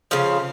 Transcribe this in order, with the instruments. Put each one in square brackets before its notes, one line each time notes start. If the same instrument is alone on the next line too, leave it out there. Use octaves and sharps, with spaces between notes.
[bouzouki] C#3 F3 F5